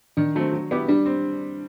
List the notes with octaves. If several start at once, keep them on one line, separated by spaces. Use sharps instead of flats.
D#3 D4
F#3 A3 C4
F#3
B3 E4 G4
G3 D4
C4